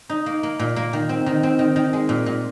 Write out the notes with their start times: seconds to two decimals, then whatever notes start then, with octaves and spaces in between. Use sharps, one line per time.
0.09 D#4
0.26 A#3
0.43 A#3
0.59 A#2
0.76 A#3
0.93 D#3
1.09 C4
1.26 D#3
1.43 C4
1.59 D#3
1.76 D#3
1.93 G#3
2.09 A#2
2.26 A#2